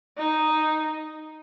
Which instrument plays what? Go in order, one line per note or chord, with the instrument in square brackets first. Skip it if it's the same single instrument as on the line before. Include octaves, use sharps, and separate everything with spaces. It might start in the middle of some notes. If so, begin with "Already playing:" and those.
[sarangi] D#4